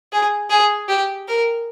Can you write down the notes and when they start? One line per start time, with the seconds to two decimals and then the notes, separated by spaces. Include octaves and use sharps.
0.12 G#4
0.50 G#4
0.88 G4
1.28 A#4